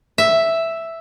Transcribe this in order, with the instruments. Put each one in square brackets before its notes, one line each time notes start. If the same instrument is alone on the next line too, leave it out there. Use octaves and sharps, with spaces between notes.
[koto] E5